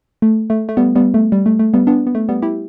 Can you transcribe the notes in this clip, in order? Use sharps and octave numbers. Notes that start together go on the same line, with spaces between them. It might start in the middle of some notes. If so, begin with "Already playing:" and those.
A3
A3
A3
G3 B3
G3 B3
A3
G3
A3
A3
G3 B3
B3 D4
B3
A3
G3 B3
E4 G4